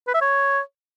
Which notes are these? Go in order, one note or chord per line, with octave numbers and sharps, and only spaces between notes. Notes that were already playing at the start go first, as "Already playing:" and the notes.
B4
E5
C#5